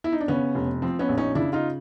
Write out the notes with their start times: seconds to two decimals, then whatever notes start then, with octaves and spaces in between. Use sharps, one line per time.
0.04 E4
0.12 D#4
0.21 D4
0.28 C#3 B3 C#4
0.55 F1
0.82 F3 C4
0.99 B3 C#4
1.09 A#1
1.17 C#4 D#4
1.35 C#3 D4 E4
1.53 D#4 F4